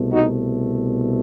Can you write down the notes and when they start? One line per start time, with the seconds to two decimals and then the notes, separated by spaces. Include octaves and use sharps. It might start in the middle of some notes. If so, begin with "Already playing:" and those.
Already playing: C2 B2 A3
0.10 D#4 F#4